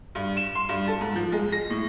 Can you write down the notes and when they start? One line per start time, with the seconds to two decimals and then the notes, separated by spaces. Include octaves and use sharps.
0.15 G2
0.37 E7
0.55 C6
0.69 G2
0.88 A4
1.01 G#2
1.16 F3
1.32 G#3
1.52 A#6
1.70 A2